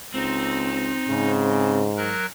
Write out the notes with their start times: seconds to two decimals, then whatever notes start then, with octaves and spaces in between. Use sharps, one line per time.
0.14 C#2 C4 D#4
1.09 G#2 C#3
1.97 F#3 A#4 F#6